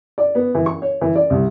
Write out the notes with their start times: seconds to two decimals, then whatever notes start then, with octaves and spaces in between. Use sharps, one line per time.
0.18 D5
0.35 B3
0.55 E3
0.66 C#6
0.82 C#5
1.01 E3
1.16 D5
1.30 C2